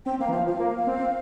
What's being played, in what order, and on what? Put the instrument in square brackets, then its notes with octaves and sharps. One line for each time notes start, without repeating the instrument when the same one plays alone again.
[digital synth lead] C4 [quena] G5
[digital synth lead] A#3 [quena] F5
[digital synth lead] E3
[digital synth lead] F3 [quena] F5
[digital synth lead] F3 [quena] F5
[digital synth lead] A#3
C4